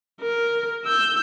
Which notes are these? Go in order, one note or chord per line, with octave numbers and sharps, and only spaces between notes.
A#4
E6 G6